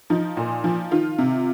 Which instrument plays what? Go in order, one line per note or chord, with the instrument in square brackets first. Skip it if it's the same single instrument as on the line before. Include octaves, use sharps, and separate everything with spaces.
[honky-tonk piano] F3 D#4
A#2
F3
D#3 F4
C3